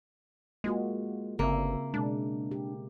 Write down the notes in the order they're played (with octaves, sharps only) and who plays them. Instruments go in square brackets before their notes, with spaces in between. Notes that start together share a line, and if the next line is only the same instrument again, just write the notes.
[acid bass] G#3 [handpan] A#3 F4 F#4
[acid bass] G1 [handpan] C#3 C4 E5 [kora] A#3
[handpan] B2 G#3 [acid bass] D4
[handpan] G4